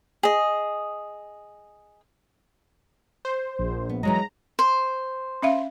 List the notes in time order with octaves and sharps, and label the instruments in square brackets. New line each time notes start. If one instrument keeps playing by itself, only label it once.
[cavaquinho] G#4 D#5
[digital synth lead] C5
[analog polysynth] A#1
[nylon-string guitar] B3
[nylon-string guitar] E3 F#3 G#3 [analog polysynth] A#5
[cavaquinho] C5
[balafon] C#4 E5 F5